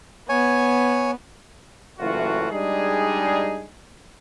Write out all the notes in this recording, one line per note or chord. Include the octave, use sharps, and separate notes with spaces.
B3 C#5 G#5
F#1 A2 E3 A3 F4 F#4
G3 G#3 D4 D#4 G#4